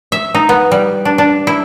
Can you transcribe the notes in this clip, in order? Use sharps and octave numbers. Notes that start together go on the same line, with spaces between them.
E5
D#4
B3
G3
D4
D4
E4